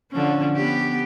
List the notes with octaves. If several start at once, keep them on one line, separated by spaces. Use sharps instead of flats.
D3 F3 C#4
B3 G4